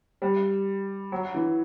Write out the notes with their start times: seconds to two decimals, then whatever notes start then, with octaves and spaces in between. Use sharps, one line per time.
0.22 G3
1.12 F#3
1.34 E3